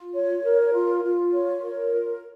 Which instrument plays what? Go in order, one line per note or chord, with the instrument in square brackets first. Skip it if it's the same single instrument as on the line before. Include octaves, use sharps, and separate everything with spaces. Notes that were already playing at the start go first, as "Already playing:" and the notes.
Already playing: [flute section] F4
C#5
A#4
F4
F4
C#5
A#4
F4